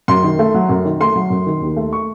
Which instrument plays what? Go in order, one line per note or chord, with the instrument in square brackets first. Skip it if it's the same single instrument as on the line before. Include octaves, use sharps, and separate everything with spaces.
[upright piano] F#2 C6
D#3
A3
F#3
F#2
D#3
A3 C6
F#3
F#2
D#3
D#2
A3
C#6